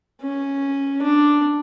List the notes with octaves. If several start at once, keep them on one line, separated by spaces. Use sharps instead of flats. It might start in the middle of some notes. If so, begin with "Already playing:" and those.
C#4
D4